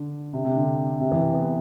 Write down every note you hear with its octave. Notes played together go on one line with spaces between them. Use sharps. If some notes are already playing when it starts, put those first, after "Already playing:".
Already playing: D3
C3
C3
D3
C3
E3
B3